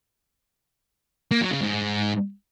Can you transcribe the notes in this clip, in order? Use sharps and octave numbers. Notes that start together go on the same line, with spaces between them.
A#3
F#3
C#3
G#2